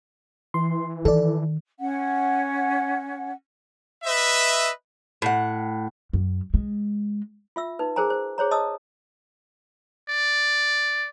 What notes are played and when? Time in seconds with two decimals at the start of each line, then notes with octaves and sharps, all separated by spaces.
0.54 E3 C6
1.05 D#3 A4 D5
1.79 C#4 F#5
4.04 B4 D#5 E5
5.22 A2 F#5
6.13 F#2
6.54 G#3
7.56 F4 E5 E6
7.79 D#4 B4
7.96 G#4 A#4 C5 G#5 A#5
8.10 C5
8.38 G#4 C5 C#5 A#5
8.51 D#5 A5 D#6 E6
10.09 D5